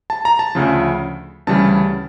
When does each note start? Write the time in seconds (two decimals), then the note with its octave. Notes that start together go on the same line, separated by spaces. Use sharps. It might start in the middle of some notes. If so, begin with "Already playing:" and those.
0.10 A5
0.25 A#5
0.39 A5
0.55 D2 C#3 F3
1.47 D2 C#3 E3 G3 A5